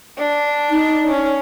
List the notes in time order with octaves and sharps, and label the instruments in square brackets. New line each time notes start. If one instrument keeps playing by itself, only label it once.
[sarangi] D4
[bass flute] D#4
[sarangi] C#4